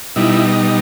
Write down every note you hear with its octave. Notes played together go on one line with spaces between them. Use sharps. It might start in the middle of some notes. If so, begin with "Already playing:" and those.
B2 G3 D#4 E4